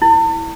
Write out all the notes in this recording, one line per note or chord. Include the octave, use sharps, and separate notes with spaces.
E4